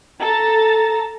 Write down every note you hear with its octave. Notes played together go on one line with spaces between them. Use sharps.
A4 A5 A#5 A6